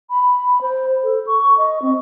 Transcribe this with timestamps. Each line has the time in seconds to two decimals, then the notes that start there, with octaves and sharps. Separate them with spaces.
0.10 B5
0.61 C5
1.03 A4
1.27 C#6
1.58 D#5
1.82 C4